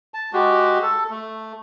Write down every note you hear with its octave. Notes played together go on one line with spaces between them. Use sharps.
A5
G#3 F#4 G4
A4
A3